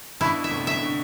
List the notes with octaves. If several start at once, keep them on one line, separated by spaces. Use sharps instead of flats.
G2 B2 E4
E5
A2 C3
E5
B2 D3